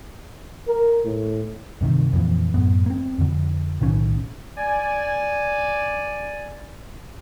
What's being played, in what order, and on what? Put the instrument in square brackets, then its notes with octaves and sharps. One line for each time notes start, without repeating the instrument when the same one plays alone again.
[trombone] A#4
A2
[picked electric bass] G2 C3 D#3
F2 A#2 E3
F#2 A2 B3
A#3 C4
F2 D3
B1 A2 D#3 C#4
[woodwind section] D5 G#5